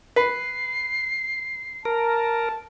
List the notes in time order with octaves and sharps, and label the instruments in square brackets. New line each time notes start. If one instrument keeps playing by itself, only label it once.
[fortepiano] B4 [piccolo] C7
[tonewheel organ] A#4 [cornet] A5